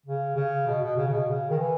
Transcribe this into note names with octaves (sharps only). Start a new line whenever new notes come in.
C#3
C#3
B2
B2
C#3
C#3
B2
C#3
D#3
E3